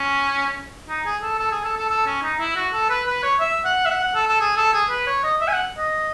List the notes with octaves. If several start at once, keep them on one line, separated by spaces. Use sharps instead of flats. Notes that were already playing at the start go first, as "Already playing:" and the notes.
Already playing: C#4
D#4
G#4
A4
A4
G#4
A4
A4
A4
C#4
D#4
E4
F#4
A4
B4
B4
C#5
E5
F#5
E5
F#5
F#5
A4
A4
G#4
A4
G#4
B4
C#5
D#5
E5
G#5
F#5
D#5